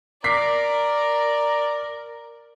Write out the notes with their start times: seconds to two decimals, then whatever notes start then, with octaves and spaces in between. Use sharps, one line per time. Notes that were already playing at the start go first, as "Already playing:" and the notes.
0.24 A#4 D5 A#5 D6 B6 C7